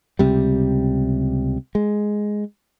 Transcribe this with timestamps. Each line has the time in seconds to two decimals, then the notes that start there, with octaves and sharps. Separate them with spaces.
0.19 C#2 C3 G3
1.75 G#3